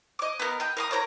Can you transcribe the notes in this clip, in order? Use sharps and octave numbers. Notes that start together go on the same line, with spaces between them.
D#5 D6
B3 A#4
D#5 G5
A#4 C6 D#6
A#4 C5 C#5 A#5